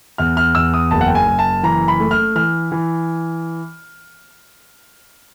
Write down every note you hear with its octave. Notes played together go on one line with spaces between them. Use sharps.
E2 F6
F6
E2 E6
D#6
F#1 A5
F#5
G5
G#5
F#1
A5
E3 A#5
B5
A3
F6
E3 F6
E3